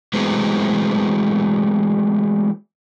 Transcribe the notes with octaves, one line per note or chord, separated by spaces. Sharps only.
E3 F#3 G#3 A3 B3 C4